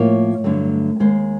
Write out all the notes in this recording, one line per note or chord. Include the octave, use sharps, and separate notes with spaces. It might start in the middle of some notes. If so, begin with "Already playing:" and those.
Already playing: A2 F3 A#3 C#5
G2 D3 F#3 A3
D#2 D#3 G#3 C5